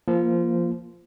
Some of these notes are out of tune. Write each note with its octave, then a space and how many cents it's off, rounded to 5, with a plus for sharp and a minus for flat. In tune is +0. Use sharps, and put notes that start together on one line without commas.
F3 -20 A#3 +0